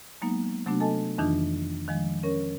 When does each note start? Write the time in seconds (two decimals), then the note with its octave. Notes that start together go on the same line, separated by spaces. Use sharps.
0.22 F#3 G#3 A#3 B3 D#4
0.66 C3 F#3 A3 B3 D4 F#4
0.80 A4 D#5 G#5 A5
1.18 F2 D#3 E3 D4 D#4 F4
1.88 D#3 F3 G#3
2.23 C#4 A#4 C#5